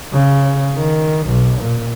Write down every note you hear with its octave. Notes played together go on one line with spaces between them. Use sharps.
C#3
D#3
B1
A#2